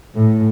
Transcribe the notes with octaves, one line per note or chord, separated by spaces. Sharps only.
A2